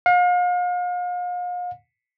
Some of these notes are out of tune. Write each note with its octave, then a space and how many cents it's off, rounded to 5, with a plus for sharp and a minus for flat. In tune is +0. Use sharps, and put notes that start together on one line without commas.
F5 +40